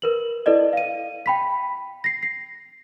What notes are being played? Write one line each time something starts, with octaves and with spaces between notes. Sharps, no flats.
A#4 B4 F#7
E4 A4 B4 D5 D#5
F5 D#7
G5 B5 B6
A#6 C7
C7